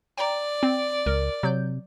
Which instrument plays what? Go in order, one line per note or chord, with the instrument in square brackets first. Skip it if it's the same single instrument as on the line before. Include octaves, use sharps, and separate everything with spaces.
[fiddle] D5 [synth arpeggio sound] G5 A#5
[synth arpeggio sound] C4
[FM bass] C#2 [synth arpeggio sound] A#4
[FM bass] C3 [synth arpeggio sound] F#3 G6